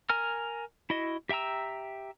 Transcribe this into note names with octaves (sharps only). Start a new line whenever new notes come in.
A#4 G#5 A#5 F6
E4 F#4 D#5
G4 E5 G5 A#5 E6